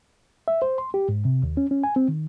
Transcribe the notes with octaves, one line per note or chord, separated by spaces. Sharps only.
E5
C5
C6
G4
G#2
C3
D#2
C#4
C#4
G#5
C4
D#3